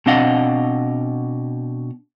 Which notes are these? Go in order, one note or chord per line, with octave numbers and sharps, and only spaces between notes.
B2 C4 D4 D#5 F5 F#5